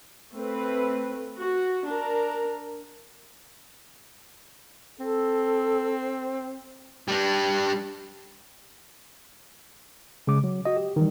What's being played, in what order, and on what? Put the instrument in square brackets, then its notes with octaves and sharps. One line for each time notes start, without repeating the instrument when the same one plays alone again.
[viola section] A3 C4 B4
F#4
D4 A#4
[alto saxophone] C4 [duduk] A4
[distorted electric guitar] G3 D4
[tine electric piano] C#3 G#3 D6
F#3
F#4 D#5
G4
D#3 E3 G3